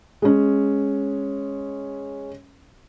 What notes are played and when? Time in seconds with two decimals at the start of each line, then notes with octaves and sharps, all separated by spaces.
0.22 G#3 C#4